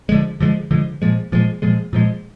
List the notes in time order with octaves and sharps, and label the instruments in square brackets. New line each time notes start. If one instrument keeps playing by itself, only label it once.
[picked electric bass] D3 F3 G#3
D3 F3 G#3
D3 F3 G#3
A#2 F3 G#3
A#2 F3 G#3
A#2 F3 G#3
A#2 F3 G#3